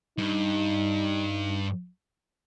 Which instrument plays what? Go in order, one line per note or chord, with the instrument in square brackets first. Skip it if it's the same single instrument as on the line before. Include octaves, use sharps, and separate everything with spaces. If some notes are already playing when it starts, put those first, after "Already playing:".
[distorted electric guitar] G2 [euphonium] D#4